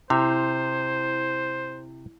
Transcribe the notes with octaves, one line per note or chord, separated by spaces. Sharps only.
C3 E4 C5